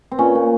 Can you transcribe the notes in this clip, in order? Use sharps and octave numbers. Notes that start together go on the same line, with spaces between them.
C4
A#2 C#4
A#2